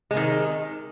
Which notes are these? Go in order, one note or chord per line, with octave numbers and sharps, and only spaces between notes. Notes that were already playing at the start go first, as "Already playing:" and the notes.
C3 D#3 G#3